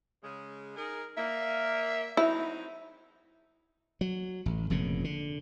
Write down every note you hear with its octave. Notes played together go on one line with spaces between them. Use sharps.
C#3 G#3
D#4 G#4 A#4
A#3 E5
F#3 C4 D#4 E4
F#3
A1
F1 F2 A#2 C#3
D3